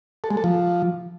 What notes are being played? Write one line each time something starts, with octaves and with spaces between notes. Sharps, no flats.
A4
G#3
A4
F3